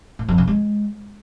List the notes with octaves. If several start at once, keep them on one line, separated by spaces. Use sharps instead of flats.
A2
F2
C#3
G#3